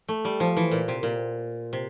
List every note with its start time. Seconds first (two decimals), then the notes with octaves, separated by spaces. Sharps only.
0.08 A3
0.25 G3
0.40 F3
0.57 E3
0.71 A#2
0.88 C3
1.03 A#2
1.73 C3